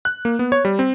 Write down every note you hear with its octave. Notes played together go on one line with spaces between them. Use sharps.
F#6
A#3
B3
C#5
G3
C4